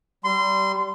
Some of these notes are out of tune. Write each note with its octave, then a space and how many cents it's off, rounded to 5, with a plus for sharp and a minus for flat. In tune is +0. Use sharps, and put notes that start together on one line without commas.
G3 -20 C6 -20